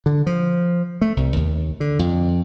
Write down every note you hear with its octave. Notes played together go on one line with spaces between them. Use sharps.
D3
F3
A3
C2
D#2
D3
F2